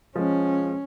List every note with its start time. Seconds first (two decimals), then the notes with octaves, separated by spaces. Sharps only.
0.16 F3 G#3 C#4